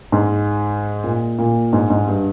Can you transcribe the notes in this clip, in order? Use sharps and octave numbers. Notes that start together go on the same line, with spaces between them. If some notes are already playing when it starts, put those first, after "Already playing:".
G#2
A#2
A#2
G#2
G#2
G2